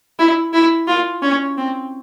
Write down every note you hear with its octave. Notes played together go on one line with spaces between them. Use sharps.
E4
E4
F4
C#4
C4